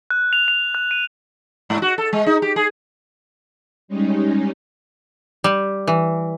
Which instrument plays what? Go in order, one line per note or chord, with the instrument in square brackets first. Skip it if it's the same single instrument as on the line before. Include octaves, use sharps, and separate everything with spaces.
[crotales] F#6
F7
F7
F#6
D#7
[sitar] G#2
F#4
A4
G#3
D#4
G4
G#4
[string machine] G3 G#3 C#4 D#4
[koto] G3
E3